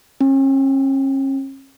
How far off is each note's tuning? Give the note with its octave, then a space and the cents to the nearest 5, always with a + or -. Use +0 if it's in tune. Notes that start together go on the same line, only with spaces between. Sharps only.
C#4 -40